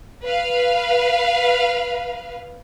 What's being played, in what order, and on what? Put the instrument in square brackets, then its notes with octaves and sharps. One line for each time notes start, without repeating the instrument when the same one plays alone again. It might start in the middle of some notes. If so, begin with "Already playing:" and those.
[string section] B4 F5